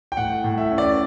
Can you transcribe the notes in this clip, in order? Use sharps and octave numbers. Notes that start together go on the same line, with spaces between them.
G5
A2 F#5
A2
E5
C#4
D5